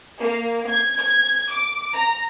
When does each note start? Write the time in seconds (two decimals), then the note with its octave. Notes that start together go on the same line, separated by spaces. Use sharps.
0.20 A#3
0.69 G#6
0.99 G#6
1.52 D6
1.94 A#5